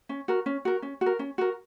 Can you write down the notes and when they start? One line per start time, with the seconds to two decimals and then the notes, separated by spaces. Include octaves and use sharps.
0.09 C#4
0.28 F#4 A#4
0.46 C#4
0.65 F#4 A#4
0.82 C#4
1.01 F#4
1.06 A#4
1.19 C#4
1.38 F#4 A#4